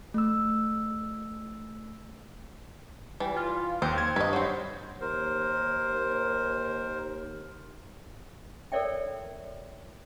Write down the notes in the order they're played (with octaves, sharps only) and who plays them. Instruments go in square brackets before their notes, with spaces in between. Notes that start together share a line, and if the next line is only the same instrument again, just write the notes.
[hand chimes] A3 E6
[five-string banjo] E3 [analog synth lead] G3
[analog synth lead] F4
[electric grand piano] D#2 [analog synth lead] C4 [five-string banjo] C5
[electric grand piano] G#6
[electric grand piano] G2 [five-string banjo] B4 D#5
[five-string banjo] F#3 C4 [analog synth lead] C5
[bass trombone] D#2 [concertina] A#4 C5
[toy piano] A4 A#4 C#5 D5 E5 G5